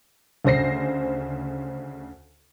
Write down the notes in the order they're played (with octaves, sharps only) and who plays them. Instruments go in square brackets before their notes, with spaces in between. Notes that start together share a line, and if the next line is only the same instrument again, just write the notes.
[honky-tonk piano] D2 C#3 C5 A#6 C7